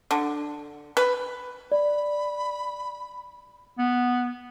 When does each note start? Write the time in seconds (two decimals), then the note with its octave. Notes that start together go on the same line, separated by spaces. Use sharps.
0.11 D3
0.97 B4
1.72 D5 B5
3.78 B3